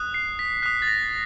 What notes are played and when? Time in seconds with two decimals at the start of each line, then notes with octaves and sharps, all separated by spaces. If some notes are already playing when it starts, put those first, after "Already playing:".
Already playing: D#6 F#6
0.14 C7
0.39 B6
0.63 D#6 F#6 B6
0.82 A6
0.87 A#6